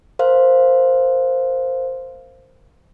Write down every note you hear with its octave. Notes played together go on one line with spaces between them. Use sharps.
A#4 C5 F5